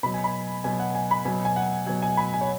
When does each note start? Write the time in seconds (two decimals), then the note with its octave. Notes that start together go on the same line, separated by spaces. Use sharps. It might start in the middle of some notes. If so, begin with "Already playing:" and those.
0.03 B2 F#3 B5
0.14 G#5
0.24 B5
0.64 B2 F#3 G#5
0.80 F#5
0.95 G#5
1.11 B5
1.25 B2 F#3 G#5
1.45 G#5
1.56 F#5
1.86 B2 F#3 G#5
2.02 G#5
2.17 B5
2.34 G#5
2.41 C#5